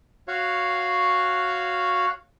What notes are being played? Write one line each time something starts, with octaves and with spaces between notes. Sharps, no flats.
F#4 C#5 F5